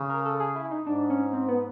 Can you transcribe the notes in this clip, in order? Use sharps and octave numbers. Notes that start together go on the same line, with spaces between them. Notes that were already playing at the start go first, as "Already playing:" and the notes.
Already playing: C#3
A#4
A4
G#4
E4
D#4
G#2 D4
C#4
C4
B3